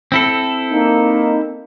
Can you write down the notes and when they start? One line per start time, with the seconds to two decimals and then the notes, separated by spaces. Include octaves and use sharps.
0.12 C4 E4 A4
0.72 A#3 D#4